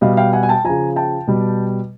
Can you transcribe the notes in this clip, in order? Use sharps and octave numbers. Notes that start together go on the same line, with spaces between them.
B2 G3 D#5 F5
F5 G5
F#5 G#5
G#5
G5 A5
C#3 F3 G#5 A#5
G5 A5
B2 G3